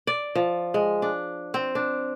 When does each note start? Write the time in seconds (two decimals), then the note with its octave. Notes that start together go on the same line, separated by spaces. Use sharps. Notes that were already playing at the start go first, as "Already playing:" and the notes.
0.07 D5
0.35 F3
0.74 G#3
1.02 D4
1.54 C4
1.75 D4